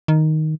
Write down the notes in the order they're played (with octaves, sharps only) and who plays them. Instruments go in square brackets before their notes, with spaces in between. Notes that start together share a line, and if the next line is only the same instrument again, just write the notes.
[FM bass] D#3